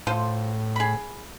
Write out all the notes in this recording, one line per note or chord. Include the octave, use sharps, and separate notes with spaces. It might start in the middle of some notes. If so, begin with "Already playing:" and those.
A2 F4 A4 C5
G#4 B5